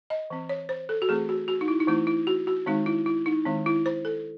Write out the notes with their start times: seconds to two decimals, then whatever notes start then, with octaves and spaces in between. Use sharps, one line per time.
0.10 D#5
0.30 E3 C4
0.49 C#5
0.69 C5
0.89 A4
1.02 F#4
1.09 E3 A3 C4 G#4
1.29 F#4
1.48 F#4
1.61 D#4
1.68 E4
1.80 D#4
1.87 E3 A3 C4 E4
2.07 E4
2.27 F#4
2.47 F#4
2.66 D#3 G#3 C4 D#4
2.86 E4
3.06 E4
3.26 D#4
3.45 D#3 G#3 C4
3.66 E4
3.86 C5
4.05 A4